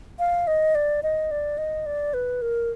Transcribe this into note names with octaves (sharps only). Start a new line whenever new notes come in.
F5
D#5
D5
D#5
D5
D#5
D5
B4
A#4